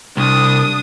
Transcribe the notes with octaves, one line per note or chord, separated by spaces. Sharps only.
C2 D4 D#6